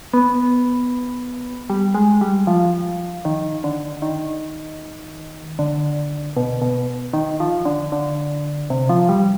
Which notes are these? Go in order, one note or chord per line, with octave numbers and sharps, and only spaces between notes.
B3
G3
G#3
G3
F3
D#3
D3
D#3
D3
B2
B2
D#3
F3
D3
D3
C3
F3
G3